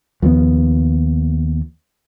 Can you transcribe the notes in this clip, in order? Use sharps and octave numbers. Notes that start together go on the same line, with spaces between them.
D#2 F3 A#3 B3